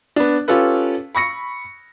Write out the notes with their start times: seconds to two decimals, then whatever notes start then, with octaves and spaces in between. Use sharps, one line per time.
0.16 B3 D4
0.48 C#4 F4 G4 A4 B4
1.15 B5 C#6 A#6 C#7